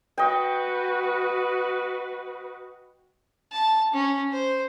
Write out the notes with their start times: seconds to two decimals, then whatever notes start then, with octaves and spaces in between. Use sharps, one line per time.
0.18 F#4 B4 D#5 G5
3.52 A5
3.93 C#4
4.32 C5